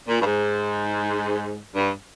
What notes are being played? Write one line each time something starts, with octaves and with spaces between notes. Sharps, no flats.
A#2
G2
G#2
G2